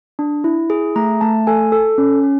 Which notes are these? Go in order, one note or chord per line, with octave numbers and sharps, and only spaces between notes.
D4
E4
G#4
A3 A#5
A3 A5
A4 G#5
A4
C#4
C#4